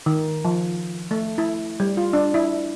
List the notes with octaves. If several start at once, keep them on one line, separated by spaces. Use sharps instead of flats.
D#3
F3
A3
E4
G3
F4
D4
E4